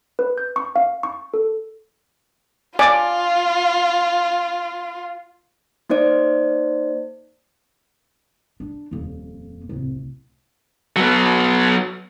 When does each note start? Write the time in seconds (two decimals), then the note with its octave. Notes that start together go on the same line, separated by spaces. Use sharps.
0.19 B4
0.38 G6
0.56 C#6
0.76 F5
1.03 C#6
1.34 A4
2.79 F4 D5 G#5 D6
5.89 A#3 D#4 C5 D5
8.60 D4
8.91 D#1 F2
9.69 D1 C2
10.96 F#3 B3